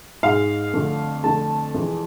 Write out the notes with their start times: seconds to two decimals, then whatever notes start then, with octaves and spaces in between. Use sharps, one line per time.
0.23 G#2 G#3 F5
0.74 F2 D3 A3
1.24 F2 D3 A3 A5
1.74 F2 E3 G#3